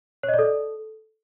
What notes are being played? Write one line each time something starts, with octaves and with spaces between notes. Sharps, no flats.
C#5
D#5
D5
A4